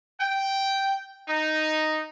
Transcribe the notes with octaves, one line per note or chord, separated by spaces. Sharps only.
G5
D#4